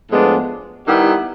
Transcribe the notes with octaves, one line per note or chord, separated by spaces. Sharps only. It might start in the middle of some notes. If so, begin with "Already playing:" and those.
A2 F3 G#3 B3 D4
D#3 G3 B3 E4 G4